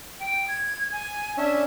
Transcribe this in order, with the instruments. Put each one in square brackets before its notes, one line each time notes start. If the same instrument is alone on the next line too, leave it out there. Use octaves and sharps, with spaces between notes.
[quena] G5
G#6
G#5
[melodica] C#4 D4 C#5 [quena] E5